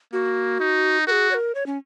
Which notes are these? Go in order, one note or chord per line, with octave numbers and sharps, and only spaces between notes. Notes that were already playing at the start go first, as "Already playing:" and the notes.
A#3 F#4
D#4
F#4 G#4 A#4
C#5
A#4
C#5
C#4